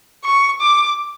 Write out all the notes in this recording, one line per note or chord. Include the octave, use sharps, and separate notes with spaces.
C#6
D6